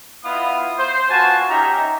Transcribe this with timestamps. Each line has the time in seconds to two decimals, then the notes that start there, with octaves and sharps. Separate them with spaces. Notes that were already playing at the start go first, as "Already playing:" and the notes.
0.24 B3 E4 F4 D#5 F5 D#6
0.77 C5
1.09 B3 F4 F#4 G#5 A5
1.48 C#4 D#4 G4 E5 A#5